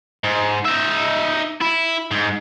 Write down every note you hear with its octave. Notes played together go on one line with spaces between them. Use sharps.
G#2
D#4 E5
E4
G#2